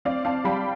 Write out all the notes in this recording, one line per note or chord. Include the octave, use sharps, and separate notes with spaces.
C4 D5 F5
C4 F5 A5
G3 G5 B5